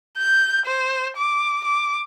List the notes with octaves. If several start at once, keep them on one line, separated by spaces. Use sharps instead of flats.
G6
C5
D6
D6